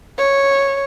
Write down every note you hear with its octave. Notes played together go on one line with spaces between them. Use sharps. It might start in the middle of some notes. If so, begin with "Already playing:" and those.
C#5